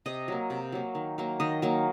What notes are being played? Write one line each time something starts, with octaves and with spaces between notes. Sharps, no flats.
C3 D#5
F#3 A#3
C3
F#3 A#3
D#3
F#3 A#3
D#3 D#5
F#3 A#3